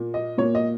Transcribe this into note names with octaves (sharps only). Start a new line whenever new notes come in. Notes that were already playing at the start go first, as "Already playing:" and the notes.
Already playing: A#2 A#3
D#5
A#2 A#3 C#5
D#5